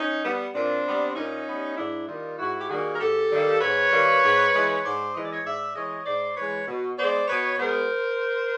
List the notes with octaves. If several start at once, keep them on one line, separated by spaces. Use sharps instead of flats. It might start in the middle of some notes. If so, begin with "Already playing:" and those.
Already playing: C#4 D#4
G3 B3
A#2 C4 D4
G3 B3
A#2 C#4 D#4
G3 B3
G#2 D4 E4
D#3 G3 A#3 D#4 F4
G#2 E4 F#4
G4
D#3 G3 A#3 F#4 G#4
A#4
G#2 G4 A4
D#3 G3 A#3
G#2 B4 C#5
D#3 G3 A#3
G#2
E3 G#3
G#2 C5 D5
E3 G#3 D#5
D5
C#5 D#5
G#2 D5 E5
E3 G#3 C#5 D#5
G#2 C5 D5
E3 G#3 B4 C#5
B2
G#3 B3 C5 D5
B2 B4 C#5
G#3 B3 A#4 C5